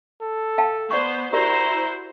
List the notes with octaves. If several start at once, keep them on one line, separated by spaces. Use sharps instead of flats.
A4
F5 G5 A5
B3 C5 D5 F#5 C#6
E4 F#4 G4 A#4 C5 D5 A#5